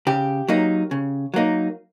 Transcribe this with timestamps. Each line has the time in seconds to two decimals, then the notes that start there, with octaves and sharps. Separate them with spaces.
0.07 C#3 G4
0.48 F#3 A#3 D#4
0.91 C#3
1.34 F#3 A#3 D#4